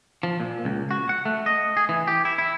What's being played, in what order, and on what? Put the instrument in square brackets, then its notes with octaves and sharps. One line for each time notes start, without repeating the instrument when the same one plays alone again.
[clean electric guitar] F3
A#2
C#2
F#4
F#5
A3
D#5
G#4
E3
G4
E4
E4